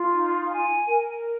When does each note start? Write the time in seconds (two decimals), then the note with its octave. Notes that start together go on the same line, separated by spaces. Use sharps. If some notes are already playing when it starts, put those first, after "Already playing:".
Already playing: F4
0.11 D#4
0.49 G#5
0.87 A#4